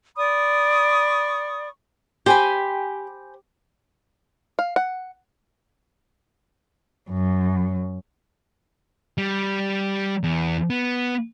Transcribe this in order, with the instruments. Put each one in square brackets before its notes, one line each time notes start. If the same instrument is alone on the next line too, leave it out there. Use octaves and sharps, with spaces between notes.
[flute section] D5 B5 C#6 D#6
[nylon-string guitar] G4 [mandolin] C5 G#5 B5
[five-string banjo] F5
F#5
[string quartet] F#2
[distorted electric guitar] G3
E2
B3